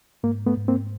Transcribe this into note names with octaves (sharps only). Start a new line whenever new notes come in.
G#2 A#3
A3 B3
G#2
A#3 C4